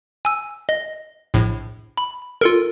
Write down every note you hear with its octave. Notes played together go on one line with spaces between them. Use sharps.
G#5 E6
D#5
A#1 A2
B5
F4 A4 A#4